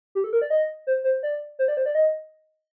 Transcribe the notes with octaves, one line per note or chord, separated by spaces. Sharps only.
G4
A4
A#4
D5
D#5
C5
C5
D5
C5
D5
C5
D5
D#5